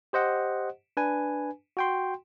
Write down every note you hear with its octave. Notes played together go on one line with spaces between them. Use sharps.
G4 C5 D#5 F#5
D4 B4 G#5
F#4 G5 C6